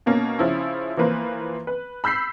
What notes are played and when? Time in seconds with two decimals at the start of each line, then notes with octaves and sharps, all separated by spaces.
0.06 B2 A#3 C#4
0.39 C#3 F3 C#4 E4
0.97 E3 F3 A#3 B4 C5
1.67 B4
2.04 B5 E6 G6 B6 C7